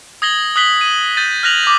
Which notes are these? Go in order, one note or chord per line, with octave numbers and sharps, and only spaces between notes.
D#6 G#6 A#6 F#7 G7
D#6 F#6 B6 F#7 G7
D#7 F#7
G6 A6 D#7
F6 F#6 A#6 F7 F#7
D6 G6